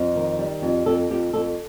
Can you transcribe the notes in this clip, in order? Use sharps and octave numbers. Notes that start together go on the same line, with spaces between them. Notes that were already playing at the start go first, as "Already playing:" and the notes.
Already playing: F2
D#3
G3
F2
F2 A4
F2 G4
F2 A4